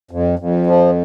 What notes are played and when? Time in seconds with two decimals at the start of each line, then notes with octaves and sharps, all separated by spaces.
0.11 F2
0.39 F2
0.66 F3